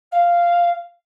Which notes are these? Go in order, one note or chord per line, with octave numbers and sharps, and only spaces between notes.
F5